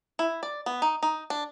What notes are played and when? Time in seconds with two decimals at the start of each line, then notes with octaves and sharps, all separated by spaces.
0.19 E4
0.43 D5
0.66 B3
0.82 D#4
1.03 D#4
1.30 D4